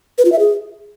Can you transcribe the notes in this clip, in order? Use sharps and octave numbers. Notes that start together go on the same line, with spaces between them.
B4
F4
E5
G#4